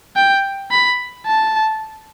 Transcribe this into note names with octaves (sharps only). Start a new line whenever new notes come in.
G5
B5
A5